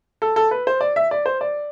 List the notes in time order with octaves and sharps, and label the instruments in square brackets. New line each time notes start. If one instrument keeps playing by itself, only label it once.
[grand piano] A4
A4
B4
C5
D5
E5
D5
C5
D5